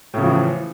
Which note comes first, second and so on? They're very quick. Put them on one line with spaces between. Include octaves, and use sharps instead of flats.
A2 C#3 F3 E3